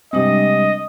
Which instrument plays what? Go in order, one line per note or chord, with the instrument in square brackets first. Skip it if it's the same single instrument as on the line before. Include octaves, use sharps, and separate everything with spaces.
[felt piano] C3 C4 [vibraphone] G3 G#3 D4 [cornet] D#5